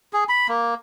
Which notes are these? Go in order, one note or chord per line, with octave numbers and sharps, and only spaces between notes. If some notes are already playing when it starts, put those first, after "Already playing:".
G#4
B5
A#3